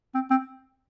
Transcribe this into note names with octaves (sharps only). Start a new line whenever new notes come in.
C4
C4